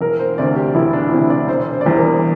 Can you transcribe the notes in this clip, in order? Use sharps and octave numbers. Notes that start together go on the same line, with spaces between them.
E1 A#4
C5
D2 C3 D5
G4
E1 E4
D4
D2 C3 E4
D5
E1 C5
C5
D5
E2 E3 G3 C5
A#4